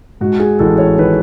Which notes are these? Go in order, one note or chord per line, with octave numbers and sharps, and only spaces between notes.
G#2 F#4
G#4
A1 A4
C#5
D#3 B4